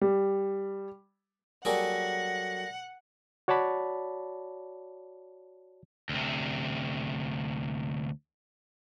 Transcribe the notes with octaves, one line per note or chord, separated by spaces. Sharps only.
G3
F#3 G3 A#3 F#4 G#4 A4 F#5 A#6
F#4 C#5 D5 A5 B5
D2 C3